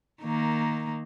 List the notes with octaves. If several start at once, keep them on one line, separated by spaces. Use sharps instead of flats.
D#3 A#3